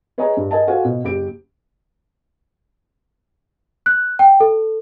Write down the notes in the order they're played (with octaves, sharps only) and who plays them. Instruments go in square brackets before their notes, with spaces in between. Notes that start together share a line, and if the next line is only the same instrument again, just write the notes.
[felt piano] G#4 B4 C#5 D#5 G#5 A#5
G2
A#4 D#5 G#5 A5
F#4 A4 C5 F5 F#5 G#5
B2
F#1 G4 D7
[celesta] F#6
G5
A4